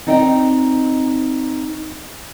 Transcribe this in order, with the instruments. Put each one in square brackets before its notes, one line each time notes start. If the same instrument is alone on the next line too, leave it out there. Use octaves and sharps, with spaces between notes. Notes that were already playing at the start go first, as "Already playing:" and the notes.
[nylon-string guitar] C4 D#4 D5 D#5 F#5 G5